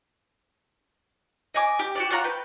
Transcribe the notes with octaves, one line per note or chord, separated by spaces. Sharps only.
D#5 G#5 D6
G4
F#4 G4 D5
F4 C#5 F#5 A#5
B4 G5